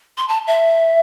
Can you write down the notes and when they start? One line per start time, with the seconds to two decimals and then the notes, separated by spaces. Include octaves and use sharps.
0.18 C6
0.28 A5
0.47 E5